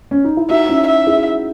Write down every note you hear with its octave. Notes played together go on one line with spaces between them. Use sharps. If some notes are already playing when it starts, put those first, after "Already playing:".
C#4
D#4
E4
D#4 F#4 E5
C#4 E4
E5
E4 G#4